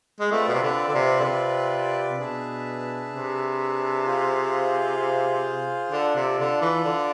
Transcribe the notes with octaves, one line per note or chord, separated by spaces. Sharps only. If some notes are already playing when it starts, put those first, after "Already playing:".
G#3
A3 C4 F4 B4 D5
B2
C3
D3
D3
C3
D3
C3
B2 D4 G#4 B4 E5 A5
C3
F4 G#4 C5 F5
D3 F4 A4 D5
C3
D3
E3
D3